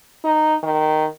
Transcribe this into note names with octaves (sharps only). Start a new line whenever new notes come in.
D#4
D#3